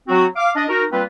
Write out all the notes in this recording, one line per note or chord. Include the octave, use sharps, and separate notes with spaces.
F#3 C4 F#4
F5 D6
D4 D#5
D#4 F#4 A#4
G3 A#3 C4 F4 B4